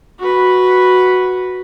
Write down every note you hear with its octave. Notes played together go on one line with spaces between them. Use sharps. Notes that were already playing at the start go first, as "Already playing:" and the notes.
F#4 B4